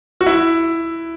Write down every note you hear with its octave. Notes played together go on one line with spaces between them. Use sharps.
F#4
E4